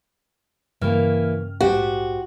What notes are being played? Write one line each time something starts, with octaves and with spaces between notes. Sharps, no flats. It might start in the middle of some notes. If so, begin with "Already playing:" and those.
G2 C#3 E3 A#3 F6
A#1 G#2 F#4 G4 C5